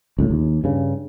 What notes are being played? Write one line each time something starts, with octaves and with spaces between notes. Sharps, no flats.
C#2 A2
D#2
G2 C#3